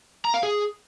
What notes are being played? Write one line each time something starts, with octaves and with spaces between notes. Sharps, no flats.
A#5
F5
G#4